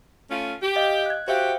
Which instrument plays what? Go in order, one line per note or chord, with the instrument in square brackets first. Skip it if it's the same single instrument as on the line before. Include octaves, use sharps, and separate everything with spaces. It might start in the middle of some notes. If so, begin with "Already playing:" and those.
[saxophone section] A3 C#4 F4
G4
[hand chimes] D#5 F5
F#6 G#6
[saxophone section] F#4 G4 [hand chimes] C5 E5 F5